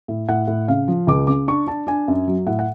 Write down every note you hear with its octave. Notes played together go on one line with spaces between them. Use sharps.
A2
A2 F#5
A2
C#3 F5
F3
C#2 D6
C#3 D6
D4 C#6
D4 A5
D4 G#5
F#2
F#3
A2 F#5
F#5